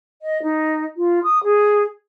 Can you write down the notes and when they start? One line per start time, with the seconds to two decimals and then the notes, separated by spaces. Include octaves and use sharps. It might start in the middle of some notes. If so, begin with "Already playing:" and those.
0.22 D#5
0.43 D#4
0.97 F4
1.24 D#6
1.44 G#4